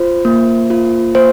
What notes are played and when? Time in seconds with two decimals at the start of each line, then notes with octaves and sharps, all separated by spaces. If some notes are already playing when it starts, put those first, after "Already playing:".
Already playing: F4 C5
0.25 A#3
0.70 F4
1.15 A#3 C5